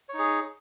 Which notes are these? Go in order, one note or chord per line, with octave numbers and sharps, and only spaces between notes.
D#4 G#4 C#5